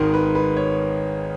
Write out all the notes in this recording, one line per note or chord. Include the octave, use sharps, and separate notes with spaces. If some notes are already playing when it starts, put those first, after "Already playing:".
Already playing: G#1 G#2 D#3 A#4
B4
B4
C#5